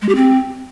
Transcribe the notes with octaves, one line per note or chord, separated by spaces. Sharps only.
G#3
G4
C4